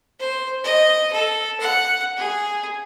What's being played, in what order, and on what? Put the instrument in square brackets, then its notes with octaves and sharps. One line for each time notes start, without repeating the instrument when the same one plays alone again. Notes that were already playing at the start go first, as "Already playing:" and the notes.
[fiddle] C5
D#5
A4
F#5
G#4